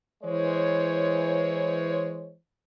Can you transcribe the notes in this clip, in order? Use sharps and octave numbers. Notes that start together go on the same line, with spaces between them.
E3 G#3 C5 C#5